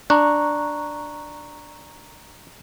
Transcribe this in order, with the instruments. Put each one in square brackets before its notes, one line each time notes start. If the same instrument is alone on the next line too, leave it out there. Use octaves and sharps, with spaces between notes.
[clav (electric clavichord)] D4 [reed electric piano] A#5 C#6 F#6